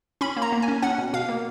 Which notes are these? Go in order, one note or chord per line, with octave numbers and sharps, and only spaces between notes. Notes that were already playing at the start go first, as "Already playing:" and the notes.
C#4 B5
A#3
A#5
A#3
G#5
C#4
C#4 F#5
B2
B2 F5
A#3